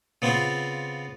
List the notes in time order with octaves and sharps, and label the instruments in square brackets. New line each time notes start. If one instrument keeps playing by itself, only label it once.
[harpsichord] C#3 B3 C4 F4